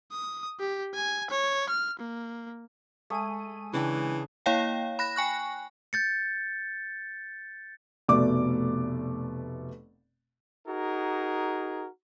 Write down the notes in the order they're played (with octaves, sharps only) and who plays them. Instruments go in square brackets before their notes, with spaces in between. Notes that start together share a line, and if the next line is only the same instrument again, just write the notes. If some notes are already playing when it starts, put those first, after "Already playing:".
[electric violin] D#6
G4
G#5
C#5
F6
A#3
[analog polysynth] G#3 G#5 D#7 [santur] A3 D#6
[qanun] C#3 D4 G5 [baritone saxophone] E3
[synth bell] A#3 E4 C#5 F5 G5
B5 F#6 A#6
G5 G#5 C#6 F#6
[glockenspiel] G6 A6 C#7
[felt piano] F1 B2 A3 D5 D6
[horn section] D#4 F#4 G#4 A#4